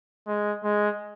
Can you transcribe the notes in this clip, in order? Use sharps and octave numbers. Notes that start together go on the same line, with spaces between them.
G#3
G#3